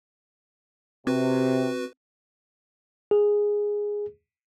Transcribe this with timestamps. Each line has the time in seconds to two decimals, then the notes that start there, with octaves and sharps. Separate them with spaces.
1.07 C3 C4 F#4 B4
3.11 G#4